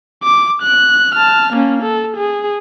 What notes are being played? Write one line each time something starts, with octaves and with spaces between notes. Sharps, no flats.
D6
F#6
A5 F6
A#3 C#4
A4
G#4